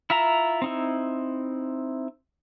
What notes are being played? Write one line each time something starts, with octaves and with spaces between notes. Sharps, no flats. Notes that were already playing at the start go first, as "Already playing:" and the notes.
E4 F4 E5 A#5
C4 D#4 E4